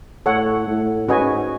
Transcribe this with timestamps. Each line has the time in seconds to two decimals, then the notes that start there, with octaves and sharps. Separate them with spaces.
0.26 A2 A4 C#5 F#5
0.67 A2
1.08 G#2 C#4 F#4 B4 D#5 G#5